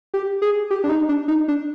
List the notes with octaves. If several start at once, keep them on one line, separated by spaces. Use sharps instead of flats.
G4
G#4
G4
D4
D#4
D4
D#4
D4